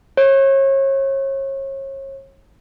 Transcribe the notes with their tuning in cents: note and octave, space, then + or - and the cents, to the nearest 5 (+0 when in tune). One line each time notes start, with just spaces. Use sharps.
C#5 -35